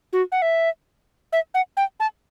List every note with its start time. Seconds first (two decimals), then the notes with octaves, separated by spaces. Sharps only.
0.13 F#4
0.32 F#5
0.42 E5
1.33 E5
1.54 F#5
1.77 G5
2.00 A5